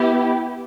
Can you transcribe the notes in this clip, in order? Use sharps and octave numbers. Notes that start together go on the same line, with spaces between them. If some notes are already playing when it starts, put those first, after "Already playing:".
Already playing: B3 E4 G4